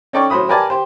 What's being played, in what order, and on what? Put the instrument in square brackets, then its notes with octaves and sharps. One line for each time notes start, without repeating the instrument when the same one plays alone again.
[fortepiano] C#4 D#4 A4 D5 G5 C#6
A2 F#3 C5 B5 D#6
G4 A#4 B4 D5 G#5 A5
G4 C5